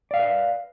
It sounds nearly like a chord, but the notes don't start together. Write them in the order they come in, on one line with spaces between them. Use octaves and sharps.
D5 F5 E5 B4